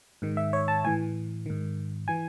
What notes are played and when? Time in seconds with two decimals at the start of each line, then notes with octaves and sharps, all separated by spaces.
0.22 G#2 D#3
0.37 E5
0.53 C#5
0.68 A5
0.84 A2 E3 G#5
1.46 G#2 D#3
2.08 E3 G#5